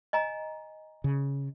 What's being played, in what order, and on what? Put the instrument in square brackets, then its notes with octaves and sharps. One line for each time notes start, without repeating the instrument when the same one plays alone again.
[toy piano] D#5 G#5 A#5
[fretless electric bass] C#3